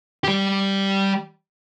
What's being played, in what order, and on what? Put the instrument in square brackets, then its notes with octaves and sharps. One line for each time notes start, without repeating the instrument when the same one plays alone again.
[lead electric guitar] G3 G4